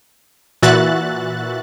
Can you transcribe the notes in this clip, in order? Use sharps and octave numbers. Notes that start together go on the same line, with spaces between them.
A#2 E3 F#4 E5 F#6 A6